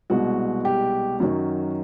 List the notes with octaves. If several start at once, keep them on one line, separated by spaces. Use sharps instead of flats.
C2 B2 G#3 F#4
G4
F#2 D#3 F#3 F#4